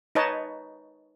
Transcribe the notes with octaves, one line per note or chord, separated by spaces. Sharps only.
D#4 B4 C#5 D#5 A5